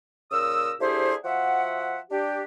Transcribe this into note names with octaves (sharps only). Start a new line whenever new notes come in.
A#2 C#3 A#4 D#6 E6
A3 D4 E4 G4 G#4 C5
F3 F#4 E5 F#5
D4 G4